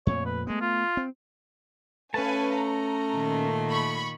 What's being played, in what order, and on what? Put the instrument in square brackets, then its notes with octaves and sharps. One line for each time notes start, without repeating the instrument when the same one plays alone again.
[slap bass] F2 A#2 A3 [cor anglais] C#5
[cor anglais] B4
[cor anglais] G#3 [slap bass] A3 B3
[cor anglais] F4
[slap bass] C4
[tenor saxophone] A3 [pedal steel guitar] C#4 A5 [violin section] B4 F5 G#5
[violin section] A#5
[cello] A#2 D#3
[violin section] B5 C#6